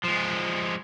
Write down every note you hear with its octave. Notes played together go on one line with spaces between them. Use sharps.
F3 G#3